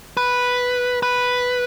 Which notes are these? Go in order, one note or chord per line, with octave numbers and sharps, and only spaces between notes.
B4
B4